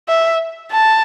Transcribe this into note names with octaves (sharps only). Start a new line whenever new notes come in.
E5
A5